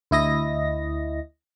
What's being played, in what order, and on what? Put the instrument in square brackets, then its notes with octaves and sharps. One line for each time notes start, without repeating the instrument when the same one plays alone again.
[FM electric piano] D2 E4 D#5 A#6